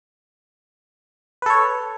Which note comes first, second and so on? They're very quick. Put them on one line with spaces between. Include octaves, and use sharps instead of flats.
B4 A4 C#5